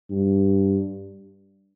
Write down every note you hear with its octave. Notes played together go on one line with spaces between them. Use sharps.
G2